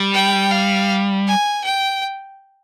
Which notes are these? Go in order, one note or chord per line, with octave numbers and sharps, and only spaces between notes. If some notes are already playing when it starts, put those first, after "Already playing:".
Already playing: G3
G5
F5
G#5
G5